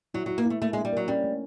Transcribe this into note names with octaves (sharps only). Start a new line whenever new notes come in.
F#3 E4
F#3 E4
A#3
A3 E4
A3 A#3
G#3 D4
G3
F#3 A#4
G3 C#4
A3